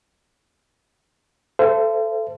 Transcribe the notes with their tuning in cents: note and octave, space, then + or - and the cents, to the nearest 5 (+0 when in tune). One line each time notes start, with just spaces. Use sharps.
A4 +0 C5 -25 E5 +45